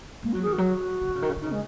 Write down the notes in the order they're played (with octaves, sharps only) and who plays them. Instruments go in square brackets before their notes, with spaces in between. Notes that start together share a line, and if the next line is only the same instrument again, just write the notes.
[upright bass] G#3 [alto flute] A#3
[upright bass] F#3 [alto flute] F#4
[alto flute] G#4
[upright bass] D#3
[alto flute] F#4
[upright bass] F#3
C#3
D#3
C#3
D#3
C#3
D#3
[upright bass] C#3 [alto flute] D#4
[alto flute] G#3